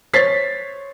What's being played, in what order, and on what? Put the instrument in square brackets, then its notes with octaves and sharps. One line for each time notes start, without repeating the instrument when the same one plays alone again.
[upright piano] C5 C#5 A6 B6 C7